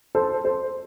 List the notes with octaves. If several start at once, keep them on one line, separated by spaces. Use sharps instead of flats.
A4 C5
A4 C5